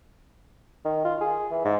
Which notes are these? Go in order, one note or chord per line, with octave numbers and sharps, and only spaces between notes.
D#3
F4
G#4
E3
G#2